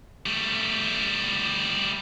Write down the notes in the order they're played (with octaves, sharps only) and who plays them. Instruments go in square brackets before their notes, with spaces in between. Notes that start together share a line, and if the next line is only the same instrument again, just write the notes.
[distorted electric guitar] G3 A3